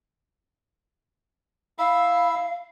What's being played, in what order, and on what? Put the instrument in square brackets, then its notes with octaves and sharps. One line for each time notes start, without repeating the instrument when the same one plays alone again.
[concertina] E4 E5 B5 [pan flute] F5